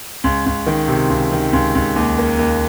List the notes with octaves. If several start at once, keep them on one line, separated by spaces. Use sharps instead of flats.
C#2
C#2
D#3
C3
C#2
D#3
C#2
C#2
D#2
A#3
D#2